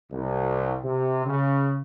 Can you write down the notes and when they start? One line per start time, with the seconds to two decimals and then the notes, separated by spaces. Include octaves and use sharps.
0.12 C2
0.84 C3
1.26 C#3